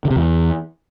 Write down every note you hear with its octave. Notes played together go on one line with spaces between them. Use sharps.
D3
C3
E2